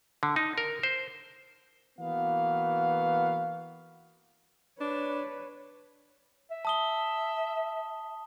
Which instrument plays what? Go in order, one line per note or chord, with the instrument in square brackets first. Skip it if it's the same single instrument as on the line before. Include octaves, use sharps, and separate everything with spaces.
[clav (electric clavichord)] D3
D#4
A#4
C5
[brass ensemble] E3 A#3 B3 F#4 F5
[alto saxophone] D4 [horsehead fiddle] B4 C#5
[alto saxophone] E5
[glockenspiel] A5 D#6 G7